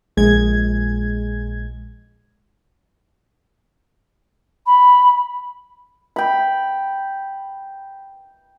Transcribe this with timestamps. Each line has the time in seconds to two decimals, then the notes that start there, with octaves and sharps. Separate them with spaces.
0.17 A#1 G#3 G#6
4.66 B5
6.16 G5 B5